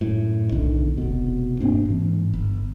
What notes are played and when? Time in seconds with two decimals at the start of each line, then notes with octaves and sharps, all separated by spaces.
0.01 F#2 A2
0.52 D#1 B1 D3 D#3
0.97 F1 B2
1.60 G2 A#3 C4 D4
1.85 G#2 E3
2.33 G1